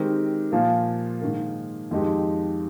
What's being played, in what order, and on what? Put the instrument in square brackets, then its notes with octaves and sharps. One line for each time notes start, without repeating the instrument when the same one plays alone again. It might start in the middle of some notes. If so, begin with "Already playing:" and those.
Already playing: [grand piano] D#3 G#3 C4 G4 A#4
A#2 F3 A#3
G#2 D#3 A#3
F2 D#3 G#3 D#4 G4